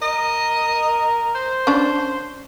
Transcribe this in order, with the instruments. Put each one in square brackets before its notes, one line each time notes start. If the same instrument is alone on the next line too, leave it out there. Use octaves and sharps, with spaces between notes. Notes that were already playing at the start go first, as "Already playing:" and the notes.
[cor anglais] A#4 [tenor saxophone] D#5
[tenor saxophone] C5
[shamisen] C#4 D4